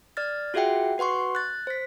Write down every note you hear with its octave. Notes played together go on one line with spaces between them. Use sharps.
D5 F6 A6
F4 F#4 G#4 E5 F#5 G5
F#4 B4 F#5 C6 C#6
F#6 A6
C5 B6